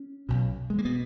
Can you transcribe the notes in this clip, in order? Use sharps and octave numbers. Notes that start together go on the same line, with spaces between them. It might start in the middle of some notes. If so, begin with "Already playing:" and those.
Already playing: C#4
B1 B2
G#3
A#3
B2 B3